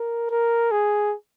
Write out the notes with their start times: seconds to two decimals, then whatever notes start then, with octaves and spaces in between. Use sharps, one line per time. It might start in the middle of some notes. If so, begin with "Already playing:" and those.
Already playing: A#4
0.31 A#4
0.72 G#4